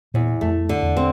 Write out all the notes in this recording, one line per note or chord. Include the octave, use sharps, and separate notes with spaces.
E2 A#2
F2 A3
D3
E2
C4